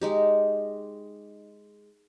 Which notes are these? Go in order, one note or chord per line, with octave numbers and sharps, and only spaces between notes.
G#3 D#4 G4